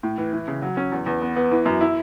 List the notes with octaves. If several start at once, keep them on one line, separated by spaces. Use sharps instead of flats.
A2
E3
E3
C#3
F#3
C#4
E2
E2
B3
B3
E3
F#2
E4